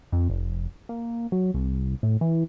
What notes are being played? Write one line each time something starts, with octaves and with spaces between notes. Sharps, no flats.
F2
F1
A#3
F#3
C2
A2
E3